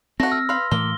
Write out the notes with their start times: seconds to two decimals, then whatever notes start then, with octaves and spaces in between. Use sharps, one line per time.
0.20 A3 C4 F#4 A#6
0.32 E6 F6
0.49 B4 F5 C6
0.71 A2 E3 A#3 G7